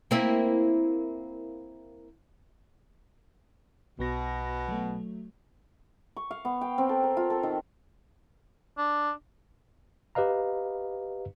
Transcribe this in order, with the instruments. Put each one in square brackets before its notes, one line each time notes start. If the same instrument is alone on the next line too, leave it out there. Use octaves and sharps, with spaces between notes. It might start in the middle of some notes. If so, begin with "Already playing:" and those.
[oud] A#3 C4 E4
[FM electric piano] B1 B3 A#6 [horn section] B2
[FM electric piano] F#3 A3
[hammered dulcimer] C#6
F5
B3
G5
C4
A4
A#4
F4
A4
D#3
[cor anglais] D4
[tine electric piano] G4 B4 D#5 F5 A#5